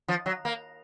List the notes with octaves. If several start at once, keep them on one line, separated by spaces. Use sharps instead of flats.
F3
F#3
A#3